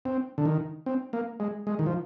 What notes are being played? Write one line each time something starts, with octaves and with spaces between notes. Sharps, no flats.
C4
D3
D#3
C4
A#3
G#3
G#3
D#3
F3